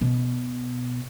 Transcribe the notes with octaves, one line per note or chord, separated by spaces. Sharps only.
B2